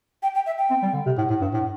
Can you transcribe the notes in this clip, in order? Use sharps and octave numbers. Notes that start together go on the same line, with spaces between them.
G5
G5
E5
G5
C4
G3
D3
C3
A2
A2
G2
A2